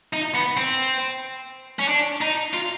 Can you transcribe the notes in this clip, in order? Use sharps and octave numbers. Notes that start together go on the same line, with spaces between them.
D#4
B3
C4
C#4
D4
D#4
F4